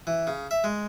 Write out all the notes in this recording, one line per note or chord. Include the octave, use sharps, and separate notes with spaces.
E3
C#3
E5
G#3